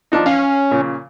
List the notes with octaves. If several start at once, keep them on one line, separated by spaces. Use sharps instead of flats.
F3 D4 D#4
C#4 F5
A#2 C#3